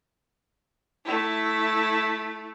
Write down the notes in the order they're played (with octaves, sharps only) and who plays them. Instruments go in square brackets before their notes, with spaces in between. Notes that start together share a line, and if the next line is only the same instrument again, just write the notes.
[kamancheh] A3 E4